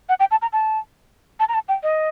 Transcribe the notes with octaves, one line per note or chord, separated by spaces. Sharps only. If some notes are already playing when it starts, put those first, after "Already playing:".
F#5
G5
A5
A#5
A5
A5
A#5
A5
G5
D#5